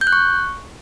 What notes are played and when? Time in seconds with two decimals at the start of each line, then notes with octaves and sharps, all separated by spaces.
0.01 G6
0.07 F#6
0.13 C#6